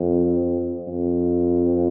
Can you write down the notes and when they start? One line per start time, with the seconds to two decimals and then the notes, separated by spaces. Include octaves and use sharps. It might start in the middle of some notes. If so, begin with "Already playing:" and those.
Already playing: F2
0.87 F2